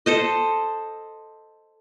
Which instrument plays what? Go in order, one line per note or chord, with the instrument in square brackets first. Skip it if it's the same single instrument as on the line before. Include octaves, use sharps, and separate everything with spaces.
[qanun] A4 C5 D#5